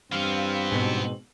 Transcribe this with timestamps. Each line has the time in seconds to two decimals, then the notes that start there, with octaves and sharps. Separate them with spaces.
0.12 G2 E3 B3 C4 F5
0.72 G#2 B2